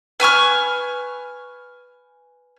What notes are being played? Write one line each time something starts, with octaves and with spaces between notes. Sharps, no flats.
B4 G#5 C#6 F6